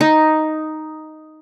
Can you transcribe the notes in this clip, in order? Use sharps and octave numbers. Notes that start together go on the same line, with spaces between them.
D#4